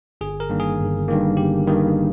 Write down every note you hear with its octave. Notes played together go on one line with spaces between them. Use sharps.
G1 G#4
A#4
G2 D#3 A#3
G#4
G1
G2 D#3 A#3
G1 G4
G2 D#3 A#3